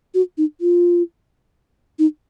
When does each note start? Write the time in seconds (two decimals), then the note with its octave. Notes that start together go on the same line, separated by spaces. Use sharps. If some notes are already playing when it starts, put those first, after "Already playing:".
0.14 F#4
0.38 D#4
0.61 F4
1.99 D#4